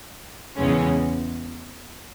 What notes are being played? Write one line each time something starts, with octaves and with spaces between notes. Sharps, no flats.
E2 C#3 G#3 C#4